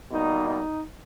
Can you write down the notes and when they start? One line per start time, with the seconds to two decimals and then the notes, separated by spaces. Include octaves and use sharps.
0.10 B2 G3 A#3 D#4
0.46 D#4